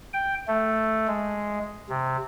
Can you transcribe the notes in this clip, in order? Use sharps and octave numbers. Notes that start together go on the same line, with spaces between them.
G5
A3
G#3
C3